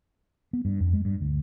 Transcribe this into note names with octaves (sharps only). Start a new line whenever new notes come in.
B3
G2
F2
G#3
G2
D2